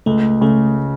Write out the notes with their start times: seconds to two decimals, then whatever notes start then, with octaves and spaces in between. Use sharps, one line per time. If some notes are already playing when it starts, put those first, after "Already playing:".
0.06 C#2 A3
0.41 C#3 A3